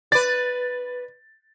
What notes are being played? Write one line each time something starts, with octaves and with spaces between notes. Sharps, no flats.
B4 D5 A6